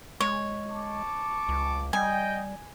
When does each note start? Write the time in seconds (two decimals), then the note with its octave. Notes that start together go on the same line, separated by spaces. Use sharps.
0.20 G#3 C#5
0.70 A5 C#6 D6
1.48 C#2
1.93 G3 D#5 G5 G#5